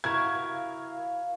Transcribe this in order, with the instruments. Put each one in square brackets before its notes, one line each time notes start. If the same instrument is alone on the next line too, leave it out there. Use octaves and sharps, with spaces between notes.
[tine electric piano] E4 A#4 [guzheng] F#4 [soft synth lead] F5 [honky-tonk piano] G#6